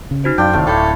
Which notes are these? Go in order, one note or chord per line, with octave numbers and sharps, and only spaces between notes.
C#3
D#4 F#4 C5
F#2 D4 F4 G5
F#1 A2 C3 D#3 A3 F5
D1 E4 A4 C#5 G5 G6